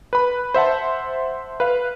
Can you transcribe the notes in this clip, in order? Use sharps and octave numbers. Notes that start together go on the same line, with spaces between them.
B4 B5
C5 E5 F#5 A5
B4 F5